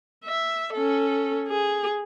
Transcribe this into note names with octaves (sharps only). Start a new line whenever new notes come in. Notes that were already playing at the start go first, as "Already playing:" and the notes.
E5
C#4 A4
G#4